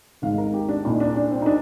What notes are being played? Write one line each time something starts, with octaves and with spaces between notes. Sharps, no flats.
G#1 G#2 D#3 F5
A#4
G4
D4
C2 A#2 D#4
D4
D4
C4
D#4
D4